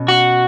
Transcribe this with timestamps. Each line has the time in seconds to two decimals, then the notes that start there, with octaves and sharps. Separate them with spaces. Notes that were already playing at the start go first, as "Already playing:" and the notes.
Already playing: B2 C#4
0.08 F#4